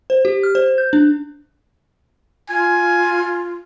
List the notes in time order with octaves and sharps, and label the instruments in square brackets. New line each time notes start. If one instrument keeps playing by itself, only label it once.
[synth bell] C5
G4
F6
C5
G6
D4
[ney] F4 [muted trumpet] G#5